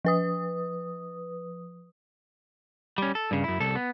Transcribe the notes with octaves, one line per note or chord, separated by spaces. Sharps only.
F3 B4 D#6
G3 C#4
A4
G2 C#3
F#2 E4
C2 A4
B3